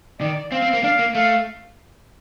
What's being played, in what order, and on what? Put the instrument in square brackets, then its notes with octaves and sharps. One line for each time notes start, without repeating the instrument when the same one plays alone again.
[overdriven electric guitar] D#3 [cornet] D5
[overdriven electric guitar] C4 [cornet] F5
[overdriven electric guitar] C4
A#3
[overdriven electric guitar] D4 [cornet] F5
[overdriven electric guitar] A#3
[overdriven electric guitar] A3 [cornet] F5